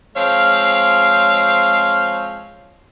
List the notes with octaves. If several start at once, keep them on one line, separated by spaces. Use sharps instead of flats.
F3 G#3 C4 C#5 F5